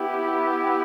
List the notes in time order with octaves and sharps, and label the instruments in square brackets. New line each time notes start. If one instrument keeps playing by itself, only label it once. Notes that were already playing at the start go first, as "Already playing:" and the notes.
Already playing: [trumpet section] B3 E4 G4